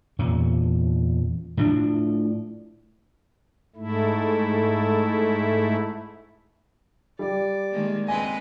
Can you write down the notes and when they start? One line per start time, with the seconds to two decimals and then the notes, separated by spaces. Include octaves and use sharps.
0.19 E2 A#2 C#4
1.57 A2 F3 D4
3.76 G#2 A3 E4
7.19 G3 D5
7.71 D#3 G#3 A#3
8.08 G#3 C4 B4 D#5 G#5